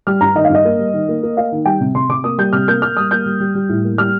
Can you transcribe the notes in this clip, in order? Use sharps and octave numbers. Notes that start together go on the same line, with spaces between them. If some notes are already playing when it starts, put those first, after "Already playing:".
G3 F6
G2 A#5
D#3 D#5
F5
G2 D#5
A#3
G3
D#3
A#3
A#3
A#3 F5
D#3
G3 G5
C3
C3 C6
C3 D6
A#3 D#6
G3 G6
C3 F6
A#3 G6
A#3 F6
G3 D#6
A#3 G6
G3
G3
G3
A2
A#3
G3 F6